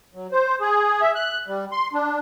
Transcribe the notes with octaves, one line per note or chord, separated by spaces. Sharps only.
F#3
C5
G#4
E5
F#6
G3
C6
D4